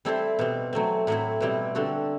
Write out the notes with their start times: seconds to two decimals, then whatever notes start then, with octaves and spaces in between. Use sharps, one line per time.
0.05 G3 C4 E4 A4 C5
0.39 B2 G3 C4
0.73 F#3 A3 C4
1.07 A2 F#3 C4 E4
1.40 B2 G3 C4 E4
1.75 D3 G3 C4 F#4 A4